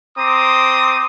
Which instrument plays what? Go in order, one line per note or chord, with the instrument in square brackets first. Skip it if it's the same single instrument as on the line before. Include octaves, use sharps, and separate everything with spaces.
[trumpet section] C4 A#5 C6 D6 D#6